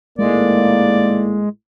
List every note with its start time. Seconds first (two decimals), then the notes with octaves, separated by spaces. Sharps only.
0.19 G#1 A2 G#3 A#3 D5